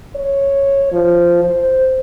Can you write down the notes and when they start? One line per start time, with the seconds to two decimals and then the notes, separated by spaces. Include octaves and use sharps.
0.16 C#5
0.92 F3
1.44 C5